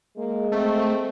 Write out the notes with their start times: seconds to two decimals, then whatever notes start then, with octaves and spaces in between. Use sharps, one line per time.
0.18 G#3 A#3
0.52 A3 C4